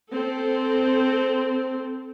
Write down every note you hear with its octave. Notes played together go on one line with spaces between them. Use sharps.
C4 A4